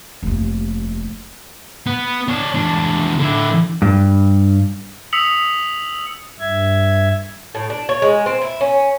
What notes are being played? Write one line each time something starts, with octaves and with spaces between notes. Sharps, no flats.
F1 D#2
B3 B4
D4 C#5
E2 D4
D3 E4
G2
D#6 E6 B6 C#7 F7 F#7
G2 E5 G#6
A2
D4
C#5
G#3
C4
E4
C#4